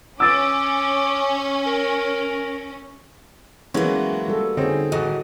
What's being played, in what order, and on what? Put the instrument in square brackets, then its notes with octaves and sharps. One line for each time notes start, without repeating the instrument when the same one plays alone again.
[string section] C#4 [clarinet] D6 [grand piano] E6 A6 D7
[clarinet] A#4
[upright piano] E3 F#3 G#3 [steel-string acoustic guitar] A#3 B3 [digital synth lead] C#4
[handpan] G3 F#4 A4
[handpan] D3 G#4 [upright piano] C4 C#4 [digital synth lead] D#4
[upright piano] D#1 F#4 [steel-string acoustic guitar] A2 [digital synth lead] D#5